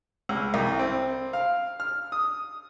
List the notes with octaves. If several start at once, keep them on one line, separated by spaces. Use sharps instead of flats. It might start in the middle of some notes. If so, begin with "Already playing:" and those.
C#2
C2
C4
F5
F6
D#6